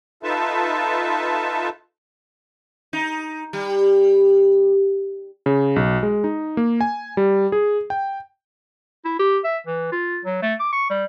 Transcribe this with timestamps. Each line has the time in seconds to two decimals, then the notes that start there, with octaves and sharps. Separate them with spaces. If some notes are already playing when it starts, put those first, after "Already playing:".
0.23 D#4 F4 A4 B4 E5 A5
2.93 D#4
3.53 G3
5.46 C#3
5.76 B1
6.03 G#3
6.24 D#4
6.57 A#3
6.81 G#5
7.17 G3
7.52 G#4
7.90 G5
9.05 E4
9.19 G4
9.44 E5
9.67 E3
9.92 F4
10.25 F#3
10.42 A3
10.60 D6
10.72 C#6
10.90 G3